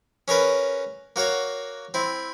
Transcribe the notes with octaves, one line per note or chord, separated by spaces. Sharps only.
C#4 G#4 A#4 B4
A#3 F#4 C#5 F5
C4 E4